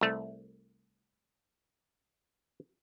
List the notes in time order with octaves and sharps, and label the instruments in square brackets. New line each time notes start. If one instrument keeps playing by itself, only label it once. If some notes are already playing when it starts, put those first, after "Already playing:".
[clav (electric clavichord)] C2 A3